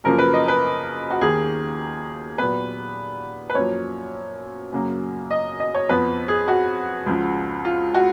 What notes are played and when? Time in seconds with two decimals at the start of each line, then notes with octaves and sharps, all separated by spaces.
0.04 F#2 C#3 F3 A#3 A#4
0.18 B4
0.33 D#5
0.48 B4
1.11 F#4
1.21 D#2 D#3 A#3 G#4
2.38 A#2 F#3 B3 B4
3.50 B4
3.55 F#2 F3 A#3 C#5
4.72 F#2 C#3 F#3 A#3
5.31 D#5
5.60 D#5
5.75 C#5
5.89 F2 F3 B3 B4
6.28 G#4
6.48 F#4
7.06 C#2 C#3 F3
7.65 F4
7.94 F#4